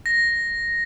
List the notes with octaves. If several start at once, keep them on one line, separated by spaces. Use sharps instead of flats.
A#6